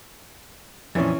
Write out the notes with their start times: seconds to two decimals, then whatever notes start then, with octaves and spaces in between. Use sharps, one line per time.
0.95 F2 A#2 E3 C#4